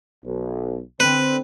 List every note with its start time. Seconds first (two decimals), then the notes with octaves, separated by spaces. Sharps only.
0.25 B1
1.00 D3 C4 B4